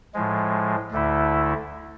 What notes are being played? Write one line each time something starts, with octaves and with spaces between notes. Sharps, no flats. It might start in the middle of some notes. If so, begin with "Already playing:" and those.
A2 F3 G#3
D2 D3 A3 E4